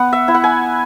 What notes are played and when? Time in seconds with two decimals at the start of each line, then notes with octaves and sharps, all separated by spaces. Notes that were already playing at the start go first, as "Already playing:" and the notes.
Already playing: B3 F#5
0.13 E5
0.28 E4
0.34 F#5
0.44 G#5